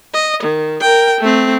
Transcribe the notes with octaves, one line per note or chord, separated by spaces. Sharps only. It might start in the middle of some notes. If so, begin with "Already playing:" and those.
D#5
D#3
A#4 G5
A3 C4